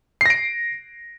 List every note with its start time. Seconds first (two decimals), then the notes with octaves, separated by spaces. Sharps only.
0.21 C7
0.26 A#6
0.30 D7